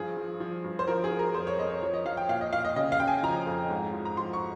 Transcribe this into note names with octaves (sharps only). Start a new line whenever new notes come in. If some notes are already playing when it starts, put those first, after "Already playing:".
Already playing: G2 F3 G#4
F3
F3
G2
C5
F3 A#4
G#4
F3
A#4
F2 C5
C#5
F2 D#5
C#5
F3 C#5
D#5
F3 F5
G5
A#2 F5
D#5
A#2 F5
D#5
C#3 D#5
F5
C#3 G5
G#5
F3 A#5
F2
G#2
F3
A#5
F3 C6
C#6